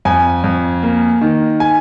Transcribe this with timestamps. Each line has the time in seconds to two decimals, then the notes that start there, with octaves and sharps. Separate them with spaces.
0.05 F2 G#5
0.44 F2
0.83 A#3
1.21 D#3
1.60 G#5